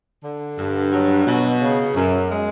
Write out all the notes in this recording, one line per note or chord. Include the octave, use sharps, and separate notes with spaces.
D3
G2
F#3
B2
C#3
F#2
G#3